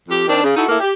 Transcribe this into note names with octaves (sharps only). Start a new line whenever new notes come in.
F2 G4
D#3 C4 D4
C#3
D#4 E4 F#4 A4
A2 A#3 E4 A4
G4